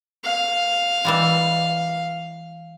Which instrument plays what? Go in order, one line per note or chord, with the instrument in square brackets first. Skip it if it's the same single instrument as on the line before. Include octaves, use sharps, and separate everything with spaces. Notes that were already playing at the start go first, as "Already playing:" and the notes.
[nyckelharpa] F5
[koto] E3 G3 G#3